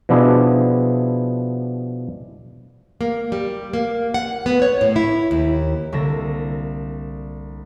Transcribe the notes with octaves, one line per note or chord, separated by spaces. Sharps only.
B2 F3 B3 D4 E4 G#4
A#3
G3
A#3
F#5
B3
C#5
A2
E4
D#2
C2 D3 A#3 E6 A#6